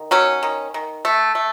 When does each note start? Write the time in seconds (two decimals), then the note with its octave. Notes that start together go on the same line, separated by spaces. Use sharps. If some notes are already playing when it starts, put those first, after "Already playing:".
Already playing: D#3
0.11 F#3 C#4
0.43 D#3
0.74 D#3
1.05 A3
1.35 A3